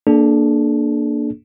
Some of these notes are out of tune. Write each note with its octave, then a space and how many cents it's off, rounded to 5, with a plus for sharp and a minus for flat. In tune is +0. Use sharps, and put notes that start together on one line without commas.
A#3 +0 D4 +0 A4 -40